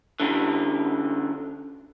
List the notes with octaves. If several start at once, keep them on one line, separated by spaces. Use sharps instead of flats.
F#2 D3